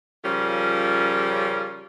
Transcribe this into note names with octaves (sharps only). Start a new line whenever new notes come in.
C#3 F3 G3 C#4 F4 A#4